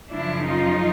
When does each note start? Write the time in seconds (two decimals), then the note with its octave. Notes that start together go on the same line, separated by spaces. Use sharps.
0.11 F#2 C#3 F3 D4 E4
0.46 D#4 F4